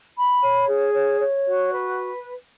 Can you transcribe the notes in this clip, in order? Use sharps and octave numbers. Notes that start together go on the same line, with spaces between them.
B5
C#5
G#4
C#5
C#5
F#4
B4